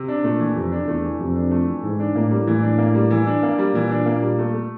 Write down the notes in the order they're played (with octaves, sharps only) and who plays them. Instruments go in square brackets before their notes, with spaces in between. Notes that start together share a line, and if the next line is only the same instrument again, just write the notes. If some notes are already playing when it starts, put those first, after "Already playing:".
Already playing: [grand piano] C3
D4
[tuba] A#2 [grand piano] A3
[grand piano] E3
[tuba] F2 [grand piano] C3
[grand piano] D4
[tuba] E2 [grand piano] A3
[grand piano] E3
[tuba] F2 [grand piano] C3
[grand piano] D4
A3
E3
[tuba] G#2 [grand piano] E3
[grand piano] D4
[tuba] A2 [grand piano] A#3
[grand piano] G3
[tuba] A2 [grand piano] E3
[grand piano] D4
A#3
G3
E3
D4
A#3
G3
[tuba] A#2 [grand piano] E3
[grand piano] D4
A#3
G3
A3
A3